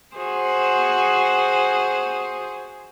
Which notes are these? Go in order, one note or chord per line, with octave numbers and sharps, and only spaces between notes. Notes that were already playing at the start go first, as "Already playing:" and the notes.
F#4 G#4 C5